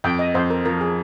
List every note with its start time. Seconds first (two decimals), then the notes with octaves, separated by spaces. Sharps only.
0.04 F2 G5
0.19 D#5
0.35 F2 C5
0.50 A#4
0.65 F3 A#4
0.81 G#4